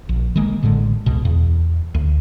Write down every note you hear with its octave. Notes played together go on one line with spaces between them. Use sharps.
A#1
D#3 G#3 A#3
A1 A2 D3 G#3
C#2 B2
E2
D2